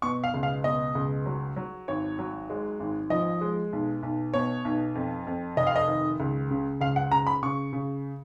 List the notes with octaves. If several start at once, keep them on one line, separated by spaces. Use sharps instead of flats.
B2 C#6
F5
C#2
F5
B2 D#5
C#2
F#3
F#3
G#1 C#5
F#3
G#3
G#1
F3 D#5
G#3
B1
B1
B2 C#5
B1
F2
F2
F1 D#5
F5
D#5
D#3
C#2
C#3
C#2 F5
F#5
C#3 A#5
B5
C#3 C#6
C#3